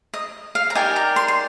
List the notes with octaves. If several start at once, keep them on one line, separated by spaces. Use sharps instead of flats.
D#5
F5
A#5
D#4 G4 A#4 D5 G#5
A#5
C6
C6